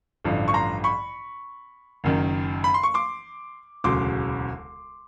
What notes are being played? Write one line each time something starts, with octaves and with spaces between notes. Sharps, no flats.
A1 G2 D3 F3
C#6
A#5 C6
B5 C#6
F#1 F#2 D#3
B5
C6
C#6
C6 D6
E1 D2 C#3 F#3 C6 D6